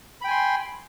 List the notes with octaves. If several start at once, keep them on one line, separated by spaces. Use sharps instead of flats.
G5 G#5 B5 C6